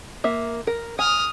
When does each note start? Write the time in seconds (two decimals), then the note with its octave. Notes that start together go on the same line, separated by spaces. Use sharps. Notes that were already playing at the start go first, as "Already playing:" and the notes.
0.24 A#3 E5
0.67 A#4
0.99 G#5 D#6 F6